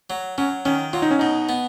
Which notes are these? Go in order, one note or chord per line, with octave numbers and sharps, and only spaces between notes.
F#3
F#3 C#4
D#3 C#4
F#3 F4
D#4
C#4
B2 D#4
B3